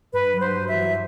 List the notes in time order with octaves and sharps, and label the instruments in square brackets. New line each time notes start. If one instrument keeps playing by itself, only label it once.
[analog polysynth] G2 [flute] B4
[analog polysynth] F#3
[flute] C5
[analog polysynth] F#3
[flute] E5
[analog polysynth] E3